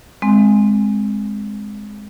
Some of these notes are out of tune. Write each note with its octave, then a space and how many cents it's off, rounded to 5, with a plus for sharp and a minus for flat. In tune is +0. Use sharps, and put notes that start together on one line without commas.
G#3 +0 C4 +0